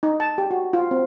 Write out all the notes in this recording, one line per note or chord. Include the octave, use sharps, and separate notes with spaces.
D#4
A5
G4
F#4
F4
C4